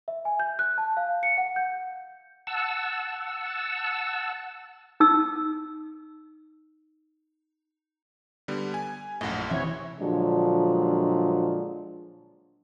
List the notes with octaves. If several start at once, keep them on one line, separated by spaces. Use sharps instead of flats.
E5
G#5
G6
F#6
A5
F5
C#7
F#5
G6
F#5 A5 E6
D#4 E6
D3 G3 B3
G#5
A#1 F#2 A2 D#5 F#5
C3 E3 C#5 E5
A#2 D3 F3 F#3 G#3 D4